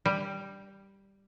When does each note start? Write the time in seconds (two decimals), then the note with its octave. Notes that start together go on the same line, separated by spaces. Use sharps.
0.05 G3